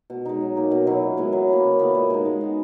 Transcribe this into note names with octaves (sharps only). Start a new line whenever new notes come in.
B2
G#3 D#4
F#3
A#3 D#4
B2
F#3 C#4 E4
A#2
G#3 B3 E4
F#3
A#3 E4 B4
C#3
E3 B3
A#2
G#3 B3 D#4
G#3
B3 F#4